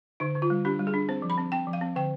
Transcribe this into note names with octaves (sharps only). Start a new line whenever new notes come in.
D3 D#4
D3
F4
G3
D4 G4
G3
G#4
D4
C4 C5
F3
B5
C4
C4 G5
F3
F5
C4
D3 G5